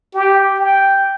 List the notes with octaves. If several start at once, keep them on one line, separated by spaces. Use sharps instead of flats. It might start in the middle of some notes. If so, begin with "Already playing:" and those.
G4
G5